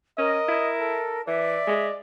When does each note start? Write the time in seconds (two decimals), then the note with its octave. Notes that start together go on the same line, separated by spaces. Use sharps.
0.18 C#4 A#4 D#5
0.48 E4
0.80 A4
1.28 E3 D5 E5
1.67 G#3